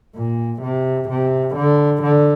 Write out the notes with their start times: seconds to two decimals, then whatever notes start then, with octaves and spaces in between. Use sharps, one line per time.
0.16 A#2
0.62 C3
1.09 C3
1.55 D3
2.03 D3